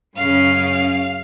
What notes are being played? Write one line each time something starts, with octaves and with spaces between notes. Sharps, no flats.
F#2 C#3 F5